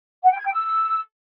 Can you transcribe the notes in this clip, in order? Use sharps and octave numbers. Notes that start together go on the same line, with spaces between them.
F#5
G5
G#6
G5
E6